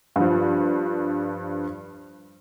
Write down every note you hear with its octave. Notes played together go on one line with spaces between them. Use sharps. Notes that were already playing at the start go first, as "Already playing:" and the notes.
G2 F3